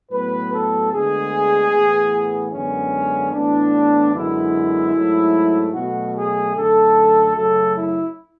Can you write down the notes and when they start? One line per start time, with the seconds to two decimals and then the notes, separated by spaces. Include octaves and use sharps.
0.12 A2 F#3 B3 B4
0.52 A4
0.92 D2 D3 G#3 B3 G#4
1.73 A2 E3 B3
2.53 F#2 D3 G#3 B3 C#4
3.33 A2 E3 B3 D4
4.13 F#2 D3 G#3 B3 E4
4.94 G#2 F#3 A3
5.74 B2 F#3 A3 F#4
6.14 G#4
6.55 F#2 D3 A3 A4
7.35 F#2 C#3 F#3 A3 A4
7.75 E4